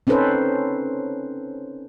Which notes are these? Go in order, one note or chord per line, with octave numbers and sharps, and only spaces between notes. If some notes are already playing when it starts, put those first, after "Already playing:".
C4 C#4 D#4 A4 B4 C5